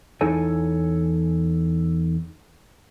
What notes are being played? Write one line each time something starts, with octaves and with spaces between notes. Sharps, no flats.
E2 D#4 E4 A4 C#5 G#5